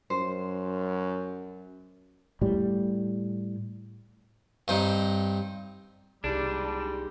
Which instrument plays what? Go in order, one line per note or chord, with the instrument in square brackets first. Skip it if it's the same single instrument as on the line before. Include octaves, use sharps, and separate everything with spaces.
[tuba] F#2 [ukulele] C5
[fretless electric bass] A2 G3
[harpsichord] G2 C4 D#4
[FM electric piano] C2 [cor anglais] G3 [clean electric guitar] D4 [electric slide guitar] D#4 G4 G#4